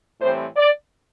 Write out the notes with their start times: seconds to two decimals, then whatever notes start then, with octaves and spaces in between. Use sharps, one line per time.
0.20 A2 E3 G3 C4 C5
0.57 D5